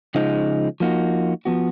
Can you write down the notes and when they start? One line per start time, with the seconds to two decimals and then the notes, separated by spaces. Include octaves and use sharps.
0.15 C#3 F3 G#3 D#4
0.80 F3 A#3 D#4 F#4
1.45 F3 B3 F#4